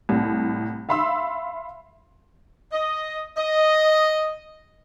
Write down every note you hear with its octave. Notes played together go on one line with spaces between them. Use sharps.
C2 A2
E5 F5 B5 C6 E6
D#5
D#5